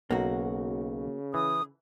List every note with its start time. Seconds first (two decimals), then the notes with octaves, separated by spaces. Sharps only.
0.11 B1 C#3 A#3 F#4 A#5
1.34 E3 D#6